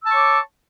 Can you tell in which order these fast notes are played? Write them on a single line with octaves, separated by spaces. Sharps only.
E6 A5 C#6 C#5 D6